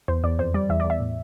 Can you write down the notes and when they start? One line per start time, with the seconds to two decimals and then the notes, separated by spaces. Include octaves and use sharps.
0.08 E2 C5
0.24 E2 D5
0.39 F2 C5
0.54 G3 D5
0.69 E2 E5
0.80 D5
0.85 E2
0.90 E5
1.00 A2